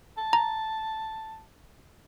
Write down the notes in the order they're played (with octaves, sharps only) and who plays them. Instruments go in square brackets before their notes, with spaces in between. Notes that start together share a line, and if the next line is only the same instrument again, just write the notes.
[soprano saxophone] A5
[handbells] A#5